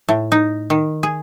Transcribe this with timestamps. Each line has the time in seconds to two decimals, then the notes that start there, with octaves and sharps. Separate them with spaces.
0.09 A2
0.32 D#4
0.70 D#3
1.03 G#4